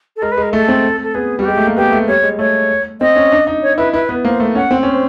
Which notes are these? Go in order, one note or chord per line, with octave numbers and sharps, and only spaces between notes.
A4
G#3 A#4
B4
G#3
A#4
A3 A4
C4
A4
B3 G#4
G3 F#4
G#3 G4
A3
A#3
B3 G4
A3
G3 C#5
G#3
A3 C#5
C4 D#5
C#4
D4
D#4
C#5
E4 B4
E4 B4
B3
A#3 C5
A3
C#4 F#5
C4
C#4 C5